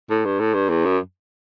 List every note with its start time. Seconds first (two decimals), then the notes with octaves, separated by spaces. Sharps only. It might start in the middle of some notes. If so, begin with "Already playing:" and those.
0.10 A2
0.25 G2
0.40 A2
0.54 G2
0.69 E2
0.85 F#2